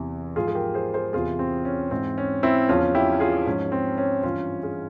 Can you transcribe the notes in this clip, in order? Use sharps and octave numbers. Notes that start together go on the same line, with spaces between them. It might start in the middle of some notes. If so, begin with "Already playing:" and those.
Already playing: E2 C3 E3
G#2 F3 F4 G#4
G#4
G4 A#4
G#4 C5
G#4 C5
E2 C3 E3 F4 G#4
C4
C#4
G#2 E3 C4
C#4
C4 E4
E2 C#3 F3 C#4 F4
E4 G4
F4 G#4
G#2 F3 C#4
C4
C#4
G2 E3 C#4 F4
F4 G#4